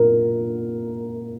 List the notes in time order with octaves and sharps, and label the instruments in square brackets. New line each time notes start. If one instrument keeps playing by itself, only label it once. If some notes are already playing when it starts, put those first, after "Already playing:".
Already playing: [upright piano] A#2 A#4